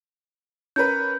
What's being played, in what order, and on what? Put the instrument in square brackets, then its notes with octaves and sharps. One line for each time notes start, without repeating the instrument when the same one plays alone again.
[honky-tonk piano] C#4 A#4 B4 [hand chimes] G6